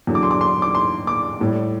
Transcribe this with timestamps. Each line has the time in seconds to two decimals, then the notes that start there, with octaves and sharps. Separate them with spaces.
0.07 E2 D3 F#3
0.15 D6
0.23 C6
0.31 D6
0.41 C6
0.62 D6
0.75 C6
1.07 D6
1.40 A2 G3